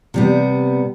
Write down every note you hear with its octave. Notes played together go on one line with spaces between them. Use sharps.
C3 G3 B3